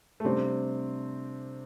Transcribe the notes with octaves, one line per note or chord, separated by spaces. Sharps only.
A3
C3 G3 C4 D4